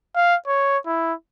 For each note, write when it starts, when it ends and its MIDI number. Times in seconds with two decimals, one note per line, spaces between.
0.15 0.35 77
0.47 0.78 73
0.86 1.13 64